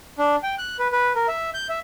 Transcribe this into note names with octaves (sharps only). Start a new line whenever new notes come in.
D4
G5
F#6
B4
B4
A#4
E5
G6
E5